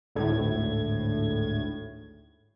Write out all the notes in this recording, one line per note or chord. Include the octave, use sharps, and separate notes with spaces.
G#1 D2 A2 G#6